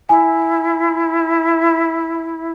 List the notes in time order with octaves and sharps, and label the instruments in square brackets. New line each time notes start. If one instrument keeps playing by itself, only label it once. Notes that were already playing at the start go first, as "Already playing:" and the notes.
[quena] E4 [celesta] G#5